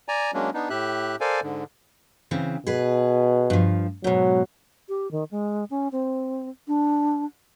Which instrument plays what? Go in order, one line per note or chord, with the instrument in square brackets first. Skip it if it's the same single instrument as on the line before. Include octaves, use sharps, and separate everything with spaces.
[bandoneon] D5 G#5 A#5
F#3 G#3 A#3 C#4 D4
B3 D4 D#4
A2 G4 E5 F#6
A4 A#4 C5 D5 F5 G#5
G#2 D3
[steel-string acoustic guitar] C#3 E3 C4
[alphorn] B2 [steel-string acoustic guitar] G#4 B4
[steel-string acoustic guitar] G2 F3
[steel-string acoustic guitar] G#2 B2 [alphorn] F#3
[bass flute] G4
D#3
G#3
C#4
C4
D4